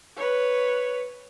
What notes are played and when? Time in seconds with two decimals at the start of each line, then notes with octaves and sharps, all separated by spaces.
0.17 B4 C#5